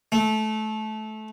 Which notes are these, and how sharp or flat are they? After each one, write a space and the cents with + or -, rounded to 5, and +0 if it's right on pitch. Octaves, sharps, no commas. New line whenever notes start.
A3 -20